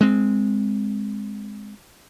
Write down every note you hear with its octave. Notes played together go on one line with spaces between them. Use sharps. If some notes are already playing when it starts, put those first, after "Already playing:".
G#3 C4